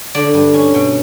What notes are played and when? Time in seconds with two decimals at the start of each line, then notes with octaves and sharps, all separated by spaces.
0.15 D3 D5
0.34 G2
0.54 C#4
0.74 B2